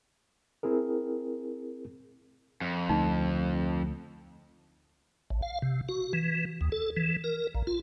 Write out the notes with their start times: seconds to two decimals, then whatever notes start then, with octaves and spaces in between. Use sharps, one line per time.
0.63 C4 E4 G#4 A#4
2.61 F2
2.89 D2 A3 D#4
5.30 A1
5.42 F5
5.62 C3
5.89 F#4
6.13 E3
6.61 D#2
6.72 A4
6.97 E3
7.24 A#4
7.55 A#1
7.67 F4